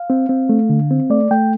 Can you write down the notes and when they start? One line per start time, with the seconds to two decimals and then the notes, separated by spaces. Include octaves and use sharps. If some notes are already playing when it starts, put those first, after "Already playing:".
Already playing: F5
0.10 C4
0.29 C4
0.49 A3
0.69 D3
0.91 C4
1.10 A3 D5
1.31 A3 G5